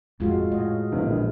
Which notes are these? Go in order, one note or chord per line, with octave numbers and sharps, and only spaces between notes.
F2 A2 G#3 F4 F#4
A2 D#5
A#1 E2 D3